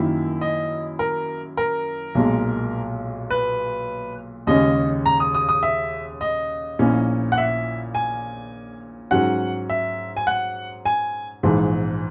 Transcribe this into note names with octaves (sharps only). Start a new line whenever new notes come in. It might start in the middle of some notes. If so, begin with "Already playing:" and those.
Already playing: F#2 D#3 A#3 E4
D#5
A#4
A#4
B1 A#2 G#3
B4
D#2 C#3 G#3 C#4 D#5
A#5
D#6
D#6
D#6
E5
D#5
A#1 A#2 A#3 C#4 E4
F#5
E5
G#5
G#2 F#3 C#4 F#5
E5
G#5
F#5
G#5
A#1 G#2 E3